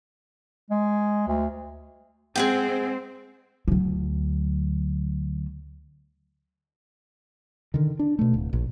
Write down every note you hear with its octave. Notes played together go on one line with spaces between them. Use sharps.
G#3
D2
G#3 C4 G#4 F#5 G5
D2 F#3
D3 D#3
D4
B2 A3
D1
A#1